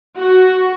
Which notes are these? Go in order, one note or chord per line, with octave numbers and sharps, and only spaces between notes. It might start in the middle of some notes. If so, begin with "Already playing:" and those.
F#4